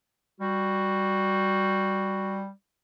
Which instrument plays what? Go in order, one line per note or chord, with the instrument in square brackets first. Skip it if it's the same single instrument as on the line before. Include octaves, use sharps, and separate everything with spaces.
[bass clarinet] G3 [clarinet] F#4